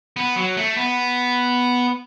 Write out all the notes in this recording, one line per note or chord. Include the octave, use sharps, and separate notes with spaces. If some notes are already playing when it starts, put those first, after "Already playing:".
B3
F#3
A3
B3